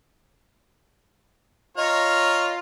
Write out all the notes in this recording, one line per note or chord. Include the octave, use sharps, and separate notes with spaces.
F4 C#5 D#5 A#5 F6